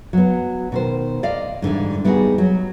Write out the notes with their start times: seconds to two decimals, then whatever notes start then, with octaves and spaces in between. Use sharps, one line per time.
0.13 F#3 B3
0.72 B2 D#3 C5
1.23 D5 D#5 F5
1.62 G#2 D3 E3 G3
2.04 G3 B3 D#4 F4 F#4 G#4
2.38 F#3